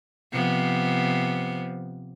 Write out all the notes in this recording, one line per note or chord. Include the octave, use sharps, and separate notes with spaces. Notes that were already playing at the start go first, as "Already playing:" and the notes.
C3 F3 B3